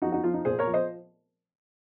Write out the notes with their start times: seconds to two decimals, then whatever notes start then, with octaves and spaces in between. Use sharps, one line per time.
0.02 F3 D#4 F#4
0.12 D#4 F#4
0.24 F3 F4
0.34 D#4
0.45 A#2 G#4 C5
0.59 A#4 C#5
0.67 F3
0.74 C5 D#5